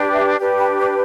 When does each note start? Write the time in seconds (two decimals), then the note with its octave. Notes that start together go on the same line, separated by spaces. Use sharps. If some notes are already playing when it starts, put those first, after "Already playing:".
Already playing: D4 G4 B4
0.13 E5
0.39 D4 G4 B4
0.59 G5 B5
0.78 A5 D6